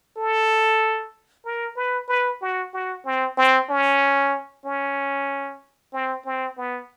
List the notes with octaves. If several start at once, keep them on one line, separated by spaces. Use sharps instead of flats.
A4
A#4
B4
B4
F#4
F#4
C4
C4
C#4
C#4
C4
C4
B3